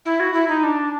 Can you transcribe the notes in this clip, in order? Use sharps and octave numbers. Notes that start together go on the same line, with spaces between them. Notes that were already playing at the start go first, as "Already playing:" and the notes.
E4
F#4
E4
D#4
D4